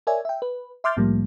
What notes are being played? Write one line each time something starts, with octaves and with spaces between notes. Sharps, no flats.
A#4 C#5 D5 E5 G#5
E5 G5
B4
E5 C6 D6 F6 G6 A6
C2 A2 F3 G3 A#3